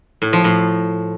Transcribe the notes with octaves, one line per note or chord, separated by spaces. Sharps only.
A2
F3
A2